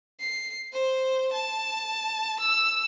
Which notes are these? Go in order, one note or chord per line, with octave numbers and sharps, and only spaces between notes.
C7
C5
A5
E6